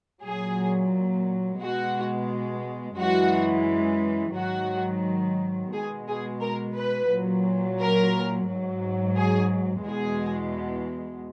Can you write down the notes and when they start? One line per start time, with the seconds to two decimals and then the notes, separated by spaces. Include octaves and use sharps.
0.24 A#2 F#3 G#4
1.61 B2 G#3 F#4
2.98 F#2 E3 G#3 F#4
4.36 G#2 D#3 F#3 F#4
5.73 B2 G#3 G#4
6.08 G#4
6.42 A#4
6.77 B4
7.11 A#2 F#3
7.80 A#4
8.48 G#2 F#3
9.17 G#4
9.85 E2 B2 G#3 G#4